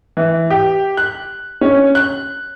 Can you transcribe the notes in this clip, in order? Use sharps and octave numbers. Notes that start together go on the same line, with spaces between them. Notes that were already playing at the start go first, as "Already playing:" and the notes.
E3
G4
F#6
C#4
F#6